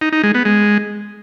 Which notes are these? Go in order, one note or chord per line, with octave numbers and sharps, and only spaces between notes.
D#4
D#4
G#3
B3
G#3